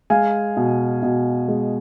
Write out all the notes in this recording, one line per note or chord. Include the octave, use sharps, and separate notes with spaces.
G#3 F5 G#5
B2
B2
G#3